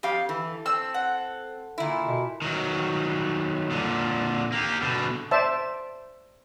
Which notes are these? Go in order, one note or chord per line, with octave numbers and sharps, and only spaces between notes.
F2 G4 F5
E3 A4
C4 E6
F#5
A#2 D3 E4
B2
D#3 F#3
A#2 D3
A#3 G4
B2 D3
C5 D5 E5 A5